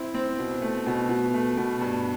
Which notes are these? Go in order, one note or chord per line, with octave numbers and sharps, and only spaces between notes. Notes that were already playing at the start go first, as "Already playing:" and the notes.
Already playing: C4 E4
C4
B2
A3
B2
B2
A3
B2
G2